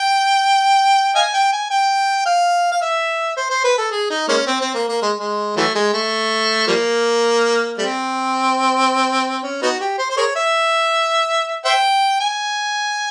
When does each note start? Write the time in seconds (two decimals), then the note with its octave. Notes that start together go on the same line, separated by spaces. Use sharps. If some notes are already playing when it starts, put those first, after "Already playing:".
Already playing: G5
1.15 D#5 F5 G#5
1.34 G5
1.53 G#5
1.70 G5
2.25 F5
2.72 F5
2.82 E5
3.36 C5
3.50 C5
3.64 B4
3.78 A4
3.91 G#4
4.10 D#4
4.28 G#3 A#3 C#4
4.47 C4
4.61 C4
4.74 A#3
4.88 A#3
5.02 G#3
5.20 G#3
5.57 E3 F#3 A3
5.75 G#3
5.94 A3
6.67 F3 G3 A#3
7.78 G3 A3 C4
9.43 C#4
9.62 B3 D#4 F#4
9.81 G4
9.99 C5
10.10 C5
10.17 G#4 A#4 C#5
10.36 E5
11.65 C5 E5 G5
12.20 G#5